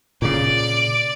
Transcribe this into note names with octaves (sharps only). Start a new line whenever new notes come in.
A#2 C#3 D5